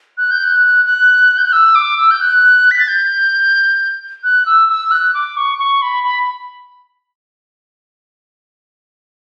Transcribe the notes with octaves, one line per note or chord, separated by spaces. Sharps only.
F#6
G6
F#6
F#6
G6
F#6
E6
D6
E6
G6
F#6
B6
A6
G6
F#6
E6
E6
F#6
D6
C#6
C#6
B5
B5